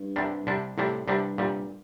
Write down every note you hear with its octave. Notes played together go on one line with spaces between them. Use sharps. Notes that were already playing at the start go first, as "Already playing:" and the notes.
Already playing: G2
C2 C3 G3 D4
C2 C3 G3 D4
C2 A2 C3 G3 D4
C2 G2 C3 G3 D4
C2 A#2 G3